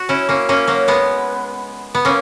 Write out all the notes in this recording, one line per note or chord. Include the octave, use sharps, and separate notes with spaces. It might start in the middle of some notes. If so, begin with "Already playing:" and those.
Already playing: F#4
C#4 E4
A#3 C#4
A#3 C#4
F#3 A#3
G#3 B3
B3
A#3 C#4